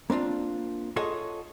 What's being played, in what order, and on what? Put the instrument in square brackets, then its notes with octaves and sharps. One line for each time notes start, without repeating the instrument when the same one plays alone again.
[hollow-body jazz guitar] A#3 C4 D4 F4
F4 G#4 A4 C#5 D#5 F#5